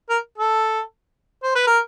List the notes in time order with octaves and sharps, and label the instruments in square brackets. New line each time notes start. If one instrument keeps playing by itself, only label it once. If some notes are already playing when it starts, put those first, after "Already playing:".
[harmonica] A#4
A4
C5
B4
A#4